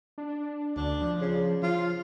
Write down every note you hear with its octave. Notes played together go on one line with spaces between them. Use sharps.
D4
D2 D4
F3
C#3
F3 F4